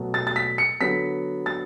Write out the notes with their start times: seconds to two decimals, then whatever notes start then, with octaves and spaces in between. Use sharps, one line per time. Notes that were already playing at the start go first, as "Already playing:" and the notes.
Already playing: B2 F#3 A3
0.14 A6
0.27 A6
0.36 B6
0.58 C#7
0.80 D3 F#3 B3 B6
1.46 A6